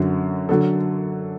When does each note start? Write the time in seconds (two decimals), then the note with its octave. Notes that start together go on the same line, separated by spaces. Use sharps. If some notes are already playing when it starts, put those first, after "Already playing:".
Already playing: F#2 D3 F#3
0.49 D3 F#3 A4